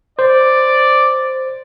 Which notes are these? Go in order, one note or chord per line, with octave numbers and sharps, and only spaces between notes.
C5 D5